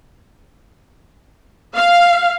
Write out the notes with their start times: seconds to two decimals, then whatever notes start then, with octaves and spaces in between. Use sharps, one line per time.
1.75 F5